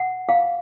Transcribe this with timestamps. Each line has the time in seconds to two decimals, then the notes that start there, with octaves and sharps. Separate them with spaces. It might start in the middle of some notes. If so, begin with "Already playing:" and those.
Already playing: F#5
0.29 F5